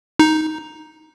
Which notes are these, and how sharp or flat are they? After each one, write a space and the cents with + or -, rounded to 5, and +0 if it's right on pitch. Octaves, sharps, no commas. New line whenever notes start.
D#4 +5